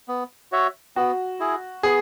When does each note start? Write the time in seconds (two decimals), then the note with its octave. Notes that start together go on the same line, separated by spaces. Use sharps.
0.08 B3
0.52 F#4 C#5 E5
0.96 B3 F#4
1.40 E4 G#4
1.83 B3 G#4